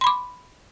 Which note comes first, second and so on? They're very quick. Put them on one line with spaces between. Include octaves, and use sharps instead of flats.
C6 B5 D6